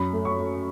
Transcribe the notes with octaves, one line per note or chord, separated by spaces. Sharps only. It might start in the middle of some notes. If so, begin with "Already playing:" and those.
Already playing: F#2 B5
A3
C#6
A3